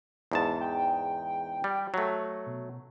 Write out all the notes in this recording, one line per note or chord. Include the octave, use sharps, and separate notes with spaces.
E2 G#2 A5
G5
G3
F#3 A3
B2